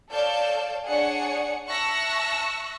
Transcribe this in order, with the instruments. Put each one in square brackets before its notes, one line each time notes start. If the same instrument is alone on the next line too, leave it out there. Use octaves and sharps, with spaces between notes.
[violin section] A4 C#5 D5 F5 A5 G6
D4 G#4 C#5 D5 F#5 C#7
E5 A5 C#6 E6 F#6 A#6